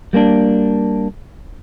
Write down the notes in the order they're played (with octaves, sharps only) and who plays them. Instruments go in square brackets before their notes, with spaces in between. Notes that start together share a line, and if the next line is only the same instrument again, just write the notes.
[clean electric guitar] G3 A#3 C4 D4